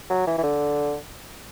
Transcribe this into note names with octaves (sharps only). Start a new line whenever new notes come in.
F#3
E3
E3
D3